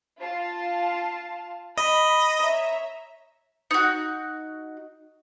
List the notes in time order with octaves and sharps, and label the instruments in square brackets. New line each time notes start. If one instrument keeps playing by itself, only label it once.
[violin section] F4 F5 A5
[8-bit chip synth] D#5 [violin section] B5
[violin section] C#5 E5 A#5
[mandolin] D#4 F#4